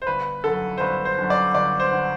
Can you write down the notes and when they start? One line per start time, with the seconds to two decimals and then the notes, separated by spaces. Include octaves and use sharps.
0.02 C5
0.07 G1 B4
0.44 F#2 D3 A4
0.78 C5
0.80 G1 B4
1.05 C5
1.18 F#2 D3
1.30 D5
1.55 G1 D5
1.80 C5
1.92 D3